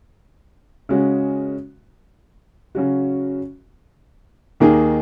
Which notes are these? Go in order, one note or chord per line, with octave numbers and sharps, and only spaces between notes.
C#3 G#3 C#4 F#4
C#3 F#3 C#4 F#4
D#2 D#3 A#3 D#4 G#4